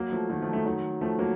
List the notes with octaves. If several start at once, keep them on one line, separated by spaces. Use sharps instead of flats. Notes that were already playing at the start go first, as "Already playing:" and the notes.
Already playing: F#3 A#3
F3 A3
D#3 F#3
F3 A3
F3 A3
D#3 F#3
F3 A3
F#3 A#3